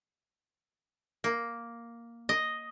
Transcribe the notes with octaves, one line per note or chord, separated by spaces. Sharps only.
A#3
D#5